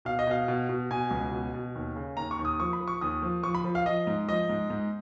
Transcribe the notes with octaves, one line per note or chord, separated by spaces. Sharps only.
B2 F5
D#5
B2 F5
B2
B2
B2 G#5
C#2
B2
B2
D#2
C#3
D#2 A#5
C#6
D#2
D#6
F3 C#6
B5
F3
C#6
D#2 D#6
F3
F3 C#6
B5
F3
F5
F3 D#5
G#2
F3 D#5
G#2
G#2